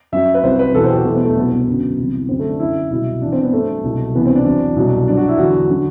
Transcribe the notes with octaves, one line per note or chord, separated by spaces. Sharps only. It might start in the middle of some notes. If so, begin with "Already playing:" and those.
F#2 F#3 E5
B4
C2 C3 F#3 C5
B4
E2 B2 F#3 A4
C5
G4
F#4
E2 B2 F#3 A3
B3
A3
C2 B2 F#3 B3
B3
F#2 D3 F#3
C2 C3 E3
F#2 D3 F#3 C4
A3
D4
F#2 D3 F#3 E4
C2 B2 F#3 E4
G2 E3 D4
C4
B3
G2 F#3 A3
C2 B2 F#3
C2 C3 E3 B3
C4
D4
E2 C3 F#3
C2 B2 F#3
G2 F#3 D4
F#4
E4
E2 D3 F#3 F#4
D3 F#3